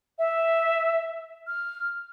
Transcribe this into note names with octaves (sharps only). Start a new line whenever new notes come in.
E5
F6